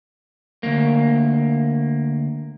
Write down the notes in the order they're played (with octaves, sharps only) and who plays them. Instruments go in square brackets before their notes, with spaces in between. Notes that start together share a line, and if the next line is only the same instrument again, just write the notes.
[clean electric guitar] D2 G2 A#3